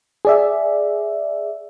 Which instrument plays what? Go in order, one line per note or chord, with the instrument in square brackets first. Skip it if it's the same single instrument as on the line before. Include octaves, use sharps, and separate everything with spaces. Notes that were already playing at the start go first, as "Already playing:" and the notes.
[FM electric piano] G#4 D5 E5